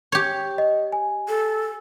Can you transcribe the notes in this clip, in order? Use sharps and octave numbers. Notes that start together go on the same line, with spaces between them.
G4 C#5
D#5
G#5
A4